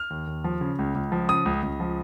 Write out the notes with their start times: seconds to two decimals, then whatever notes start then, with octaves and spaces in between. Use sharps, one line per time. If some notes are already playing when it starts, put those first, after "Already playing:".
Already playing: F6
0.10 D#2
0.27 D#2
0.44 F3
0.61 C#3
0.79 C#2
0.95 C#2
1.12 F3
1.29 C#3 D#6
1.45 C#2
1.63 C#2
1.80 F3